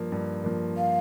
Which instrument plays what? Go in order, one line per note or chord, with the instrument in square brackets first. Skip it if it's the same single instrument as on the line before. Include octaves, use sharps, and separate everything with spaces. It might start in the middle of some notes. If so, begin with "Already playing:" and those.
Already playing: [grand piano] G2 F3 A#3
G2
F3 A#3
[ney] F5